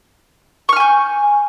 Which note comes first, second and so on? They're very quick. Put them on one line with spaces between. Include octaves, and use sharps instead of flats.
C#6 F6 G#5 G6